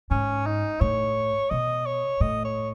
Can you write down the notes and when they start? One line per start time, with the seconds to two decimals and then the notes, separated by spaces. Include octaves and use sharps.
0.11 G#2 C#4
0.47 D#4
0.81 A2 C#5
1.50 B2 D#5
1.86 C#5
2.20 A2 D#5
2.45 C#5